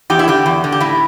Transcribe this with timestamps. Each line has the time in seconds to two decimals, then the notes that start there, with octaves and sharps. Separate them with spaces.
0.10 E2 G4
0.19 E4
0.28 D3 G4
0.46 E2
0.64 D3
0.72 G4
0.81 A2 E4